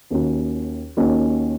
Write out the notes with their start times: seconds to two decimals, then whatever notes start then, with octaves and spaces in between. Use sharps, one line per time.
0.11 D#2 D#3 A#3 C#4 F#4
0.97 D#2 D#3 A#3 C#4 F#4